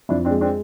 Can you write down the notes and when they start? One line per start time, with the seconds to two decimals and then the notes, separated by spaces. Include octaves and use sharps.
0.09 F2 D4 E4
0.25 C4 D4
0.30 G#3
0.41 C4 D4